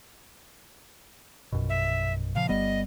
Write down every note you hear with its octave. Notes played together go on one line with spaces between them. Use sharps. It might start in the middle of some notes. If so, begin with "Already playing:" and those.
A#1 F#2 B2
E5
A#2 C#3 F3 F5
G1 G3 B3 D#5